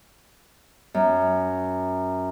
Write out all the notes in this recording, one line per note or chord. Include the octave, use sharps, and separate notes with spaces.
F#2